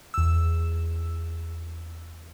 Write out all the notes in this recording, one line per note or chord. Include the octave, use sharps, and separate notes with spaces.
E2 E6